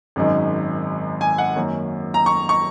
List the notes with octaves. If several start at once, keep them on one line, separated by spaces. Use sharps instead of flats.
G#1 F#2 D#3 G#3
G#5
F#5
F#2 D#3 A#3 C#4
A#5
C#6
C#6